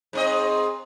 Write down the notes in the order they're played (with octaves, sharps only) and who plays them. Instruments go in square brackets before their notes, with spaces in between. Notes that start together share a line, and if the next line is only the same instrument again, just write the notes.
[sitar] G#2 C4 D#5